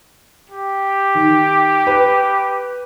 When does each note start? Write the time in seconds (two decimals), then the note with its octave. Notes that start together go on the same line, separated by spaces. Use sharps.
0.50 G4
1.15 D#3
1.87 B4